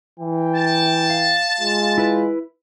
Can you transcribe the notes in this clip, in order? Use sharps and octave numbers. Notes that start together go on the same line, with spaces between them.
E3 G5
A5
F5
G#3 F4
E4 B4